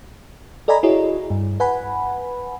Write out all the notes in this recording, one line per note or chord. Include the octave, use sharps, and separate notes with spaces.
A4 D5 D#5 G#5 A#5 B5
E4 F#4 G#4 C#5 D#5
G2
B4 F#5 G#5 B5